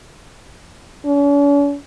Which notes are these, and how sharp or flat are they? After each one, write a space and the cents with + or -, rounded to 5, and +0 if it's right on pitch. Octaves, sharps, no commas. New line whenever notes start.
C#4 +45